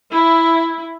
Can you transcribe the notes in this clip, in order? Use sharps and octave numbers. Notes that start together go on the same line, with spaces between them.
E4